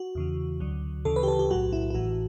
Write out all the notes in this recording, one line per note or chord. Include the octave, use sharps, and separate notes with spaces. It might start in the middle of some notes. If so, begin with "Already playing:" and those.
Already playing: F#4
E2 C#3 E3
D2 D3 F#3
D2 C#3 E3 A4
B4
G4
A4
G4
B1 A2 F#3 F#4
E4
E4
A1 A2 E3 F#4